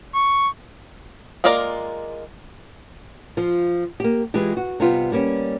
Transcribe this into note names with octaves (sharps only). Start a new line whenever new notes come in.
C#6
G#3 A#3 F4 A#4 D5
F3 F4
A#3 G4
E3 G#3 F4 G4
F#4
C3 G3 B3 F4
G3 A#3 C#4 G4